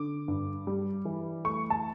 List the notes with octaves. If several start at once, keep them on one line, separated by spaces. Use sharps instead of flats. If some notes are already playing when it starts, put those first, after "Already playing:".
Already playing: D3 D6
G2
G3
E3
A3 C#6
A5